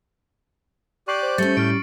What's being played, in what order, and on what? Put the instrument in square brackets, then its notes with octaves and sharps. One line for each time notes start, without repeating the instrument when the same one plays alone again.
[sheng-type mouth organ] G4 D5 F#6 [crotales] C#6 C7 F#7
[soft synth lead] C5
[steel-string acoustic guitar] G3 C#4 [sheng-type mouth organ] A3 G6 [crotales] A6 C#7
[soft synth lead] A2 [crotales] F6 A6 D7